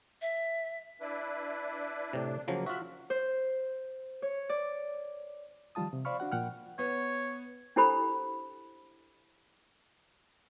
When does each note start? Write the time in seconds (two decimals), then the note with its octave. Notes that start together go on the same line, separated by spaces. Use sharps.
0.22 E5
1.01 D4 E4 B4
2.13 A2 C3 D4
2.48 C#3 F3 F#3 A#3
2.66 F4 F#4 E5 F#6
3.10 C5
4.22 C#5
4.49 D5
5.75 D#3 F3 G3 F4 A5 D#6
5.93 C3
6.05 C5 D5 F5 B5 C#6 F6
6.20 D4 F#4 F#5
6.32 A#2 F3 F#5 G5 F6
6.79 B3 C#5
7.76 D4 E4 G4 A4 C5 B5